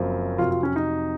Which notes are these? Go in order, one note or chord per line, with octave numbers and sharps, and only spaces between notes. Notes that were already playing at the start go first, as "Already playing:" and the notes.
Already playing: F#1 F#2 F3 C4
F2 C3 F#3 F4
F4
C#4
D#4